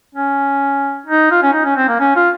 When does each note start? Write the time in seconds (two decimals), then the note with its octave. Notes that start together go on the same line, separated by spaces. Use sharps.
0.15 C#4
1.06 D#4
1.31 F4
1.42 C#4
1.53 D#4
1.64 C#4
1.77 C4
1.88 A#3
1.99 C#4
2.16 F4